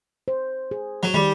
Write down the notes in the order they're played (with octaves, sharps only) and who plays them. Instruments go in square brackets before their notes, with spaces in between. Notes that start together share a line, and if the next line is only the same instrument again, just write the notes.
[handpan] C5
G#4
[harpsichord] F#3
[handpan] D#3 [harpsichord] G3